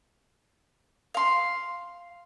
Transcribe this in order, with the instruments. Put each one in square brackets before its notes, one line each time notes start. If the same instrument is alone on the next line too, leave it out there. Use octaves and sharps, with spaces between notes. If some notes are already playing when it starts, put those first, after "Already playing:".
[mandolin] F5 C6